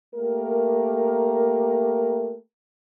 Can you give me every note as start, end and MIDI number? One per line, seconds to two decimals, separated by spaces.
0.15 2.36 57
0.15 2.36 58
0.15 2.36 67
0.15 2.36 70